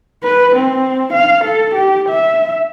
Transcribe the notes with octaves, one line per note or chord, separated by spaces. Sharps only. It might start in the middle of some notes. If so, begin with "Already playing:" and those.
B4
C4
F5
A4
G4
E5